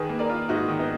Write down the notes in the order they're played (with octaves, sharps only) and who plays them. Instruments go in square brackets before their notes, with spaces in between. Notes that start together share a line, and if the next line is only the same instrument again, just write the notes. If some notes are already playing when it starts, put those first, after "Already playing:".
Already playing: [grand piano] D#3 [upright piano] G#4 B4
[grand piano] A#3
[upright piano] A#4 D5
[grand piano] F4
[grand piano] G#2 [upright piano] D#4 F#4
[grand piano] D#3
[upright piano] B3 D#4